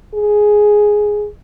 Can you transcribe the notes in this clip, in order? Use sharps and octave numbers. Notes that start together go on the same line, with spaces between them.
G#4